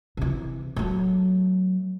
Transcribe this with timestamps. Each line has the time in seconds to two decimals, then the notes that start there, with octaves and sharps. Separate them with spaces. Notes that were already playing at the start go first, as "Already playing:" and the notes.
0.17 C3 E3
0.76 F#3 A3